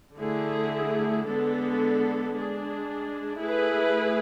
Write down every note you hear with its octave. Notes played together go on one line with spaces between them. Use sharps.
D3 A3 E4 G#4
D3 G#3 B3 D4 A4
G#3 D4 G#4
A3 E4 G#4 B4